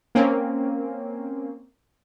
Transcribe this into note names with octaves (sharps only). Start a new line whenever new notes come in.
A#3 C4 C#4